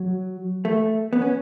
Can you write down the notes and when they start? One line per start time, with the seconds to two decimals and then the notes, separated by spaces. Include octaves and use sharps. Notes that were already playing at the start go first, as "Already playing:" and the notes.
Already playing: F#3
0.65 A3
1.13 B3
1.22 C#4